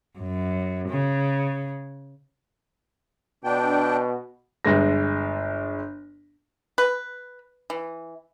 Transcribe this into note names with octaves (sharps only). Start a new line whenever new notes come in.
F#2
C#3
B2 D4 G5
G1 G#3 A#6
B4
E3